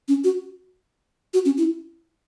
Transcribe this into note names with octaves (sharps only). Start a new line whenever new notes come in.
C#4
F#4
F#4
C#4
E4